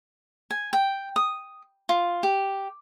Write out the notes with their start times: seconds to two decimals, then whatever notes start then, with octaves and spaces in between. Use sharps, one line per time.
0.51 G#5
0.73 G5
1.16 D#6
1.89 F4
2.23 G4